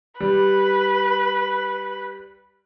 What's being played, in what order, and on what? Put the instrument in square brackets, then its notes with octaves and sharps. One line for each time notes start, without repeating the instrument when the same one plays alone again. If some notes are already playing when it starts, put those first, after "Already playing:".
[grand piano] G3 [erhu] B4